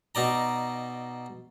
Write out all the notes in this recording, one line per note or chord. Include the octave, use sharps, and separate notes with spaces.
B2 D#4 D5 A#5